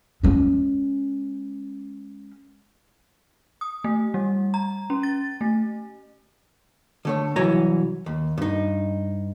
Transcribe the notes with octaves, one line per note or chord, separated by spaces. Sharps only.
G#3 C#4
D#6
A3
G3
A#5
C#4
A6
A3
D3 A3 C#5
C2 E3 F#3 C#5 G#5 A#5
D#2
G2 D#4